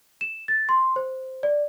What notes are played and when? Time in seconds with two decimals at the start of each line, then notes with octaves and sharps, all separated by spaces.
0.21 E7
0.48 A6
0.69 C6
0.96 C5
1.43 D5